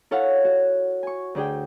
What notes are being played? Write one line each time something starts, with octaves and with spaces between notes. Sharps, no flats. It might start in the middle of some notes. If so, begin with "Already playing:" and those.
E4 A4 C#5 F5 F#5
F#4
G#5 C#6
D2 D4 G#4 G5